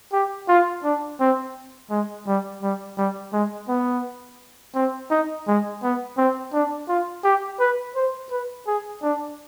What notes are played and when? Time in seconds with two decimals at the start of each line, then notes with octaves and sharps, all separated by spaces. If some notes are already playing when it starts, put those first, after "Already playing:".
0.13 G4
0.48 F4
0.84 D4
1.20 C4
1.91 G#3
2.27 G3
2.62 G3
2.98 G3
3.33 G#3
3.68 B3
4.75 C4
5.11 D#4
5.47 G#3
5.83 B3
6.18 C4
6.53 D4
6.89 F4
7.24 G4
7.60 B4
7.95 C5
8.31 B4
8.67 G#4
9.02 D4